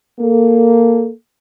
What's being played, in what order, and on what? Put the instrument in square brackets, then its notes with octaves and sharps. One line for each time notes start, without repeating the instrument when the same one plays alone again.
[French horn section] A#3 A4